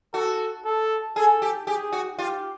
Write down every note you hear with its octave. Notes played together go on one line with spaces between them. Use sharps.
F#4 A4
A4
G#4 A4
G4
G4 G#4
F#4
F4 G4